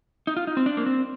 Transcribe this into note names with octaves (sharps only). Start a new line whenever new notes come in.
D#4
F4
D#4
C4
D4
A#3
C4